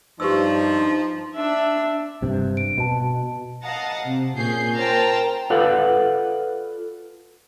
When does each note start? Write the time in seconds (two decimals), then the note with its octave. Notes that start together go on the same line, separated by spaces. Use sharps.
0.20 G2 F3 D#4 G4 B4 E6
1.35 D4 E5
2.22 G2 C3
2.57 D7
2.78 B2 F#4 A5
3.64 D#5 F5 F#5 A5 A#5
4.04 C3
4.37 A#2 C#4 G#4 G6 C7
4.76 A#4 C5 G5 A5 A#5 F6
5.50 F4 A4 B4 D5 F#5